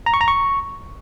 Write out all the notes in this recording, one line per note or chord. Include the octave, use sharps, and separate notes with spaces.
A#5
C#6
A#5
C#6